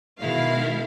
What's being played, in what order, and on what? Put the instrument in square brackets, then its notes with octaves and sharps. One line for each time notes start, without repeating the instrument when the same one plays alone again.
[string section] B2 D#3 G#3 E4 F5